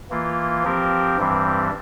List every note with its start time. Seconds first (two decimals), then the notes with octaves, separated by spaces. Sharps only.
0.10 E3 A#3 F4
0.64 F3 C4 G4 A#4
1.17 G2 E3 G3 C4